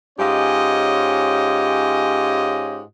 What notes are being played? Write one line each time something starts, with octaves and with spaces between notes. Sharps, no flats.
G#2 C#4 F4 G4 C#5 D#5